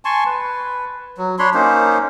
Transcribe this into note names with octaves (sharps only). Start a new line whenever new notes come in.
G#5 A5 C6 C#6
B4
F#3
D4 C#5 B5 C6
A#3 C#4 D#4 C5